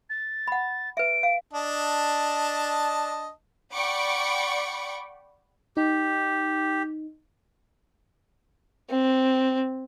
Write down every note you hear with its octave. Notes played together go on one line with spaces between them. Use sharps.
A6
F#5 B5
B4 E5 D7
F5
D4 D#5 A5
D5 F#5 G5 B5 C#6 D6
D#4 G4
C4